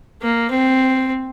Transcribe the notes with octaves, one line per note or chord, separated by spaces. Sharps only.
A#3
C4